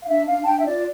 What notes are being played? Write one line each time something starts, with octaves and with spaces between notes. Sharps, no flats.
F5
D4 E5
D4 F5
A5
D4 G5
E5
F4 D5